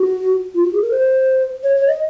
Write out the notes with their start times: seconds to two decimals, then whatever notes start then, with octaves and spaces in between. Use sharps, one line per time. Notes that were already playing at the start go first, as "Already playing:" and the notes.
Already playing: F#4
0.54 F4
0.63 F#4
0.73 G#4
0.82 A#4
0.91 C5
1.63 C#5
1.75 C#5
1.87 D#5